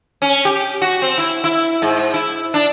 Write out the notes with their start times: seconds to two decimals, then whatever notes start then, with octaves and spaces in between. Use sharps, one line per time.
0.22 C#4
0.45 G4
0.82 F#4
1.02 C4
1.18 E4
1.44 E4
1.82 G#2
2.14 E4
2.54 D4